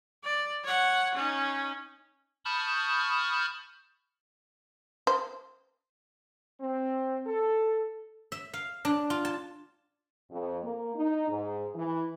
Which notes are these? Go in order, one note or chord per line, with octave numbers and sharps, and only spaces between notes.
D5
C#5 F#5
C#4 D#4
A5 B5 C#6 D#6 F6 G6
C5
C4
A4
E5
F5
D4
F4
A5
F2
A#3
D#4
G#2
E3